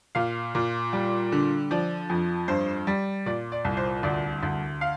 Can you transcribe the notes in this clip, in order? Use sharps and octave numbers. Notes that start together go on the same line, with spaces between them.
A#2 F5
A#2
G3
D3
F3 D5
F2
G2 C5
G3
A#2 D5
D5
C2
C5
D2 D5
D2
F5